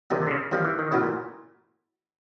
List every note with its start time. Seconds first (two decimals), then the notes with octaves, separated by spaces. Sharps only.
0.10 C3 D#3 G3 A#3 C#4
0.22 C3
0.27 D3
0.31 C#3
0.52 D#3 F3 G3 A#3 C#4
0.65 E3
0.79 D#3
0.91 A2 C#3 F#3 B3 E4
1.02 A#2